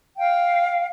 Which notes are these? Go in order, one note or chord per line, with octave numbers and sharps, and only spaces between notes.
F5 G5